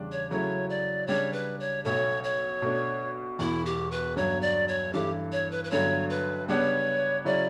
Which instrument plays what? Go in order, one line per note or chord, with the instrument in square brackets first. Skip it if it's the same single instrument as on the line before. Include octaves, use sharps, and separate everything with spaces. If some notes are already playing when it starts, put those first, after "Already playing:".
Already playing: [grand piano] E2 C#3 G3 D4
[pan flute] C#5
[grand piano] C#3 F#3 A3 E4 [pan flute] C#5
[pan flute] D5
[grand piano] C#3 G3 D4 [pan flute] C#5
[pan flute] B4
C#5
[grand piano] B1 B2 A3 [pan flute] C#5
[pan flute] C#5
[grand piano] B2 A3 D4
[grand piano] E1 E2 B2 [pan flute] E4
[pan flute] G4
B4
[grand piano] G1 G2 F#3 [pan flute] C#5
[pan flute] D5
C#5
[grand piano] G2 E3 A3 E4 [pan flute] G4
[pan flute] C#5
B4
B4
[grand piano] G1 G2 D3 F#3 [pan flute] C#5
[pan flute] B4
[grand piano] C#3 G3 B3 D4 G4 [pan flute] C#5
[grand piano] C#3 F#3 C#4 E4 [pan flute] D5